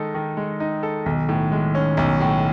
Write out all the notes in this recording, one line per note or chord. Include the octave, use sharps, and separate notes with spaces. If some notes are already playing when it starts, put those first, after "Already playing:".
Already playing: D#3 G#3 D#4 A4
D#3
G#3
D#4
A4
B1 D#3
A2
G#3
C#4
B1
A2